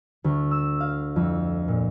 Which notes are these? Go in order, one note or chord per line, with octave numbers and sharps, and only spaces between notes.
D2
E6
F5
F2
A#2